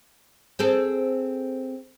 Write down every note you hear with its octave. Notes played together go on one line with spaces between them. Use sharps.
C4 G#4 A4